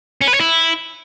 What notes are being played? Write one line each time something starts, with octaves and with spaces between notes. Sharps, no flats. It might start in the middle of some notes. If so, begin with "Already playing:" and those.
C#4
B4
C#5
E4